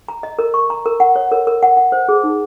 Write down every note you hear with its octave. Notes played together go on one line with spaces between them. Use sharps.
A#5
D#5
A#4
C#6
A#5
A#4
F#5
C#5
A#4
A#4
F#5
F#5
C5
G#4
D#4